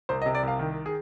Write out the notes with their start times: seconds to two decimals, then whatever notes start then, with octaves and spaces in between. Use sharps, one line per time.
0.09 C2 C5
0.22 D#5
0.26 C3
0.35 D5
0.43 C2 F5
0.59 D#3
0.86 G#4